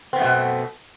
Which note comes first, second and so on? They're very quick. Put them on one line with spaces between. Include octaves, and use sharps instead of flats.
C4 B3 F#2 A3 B2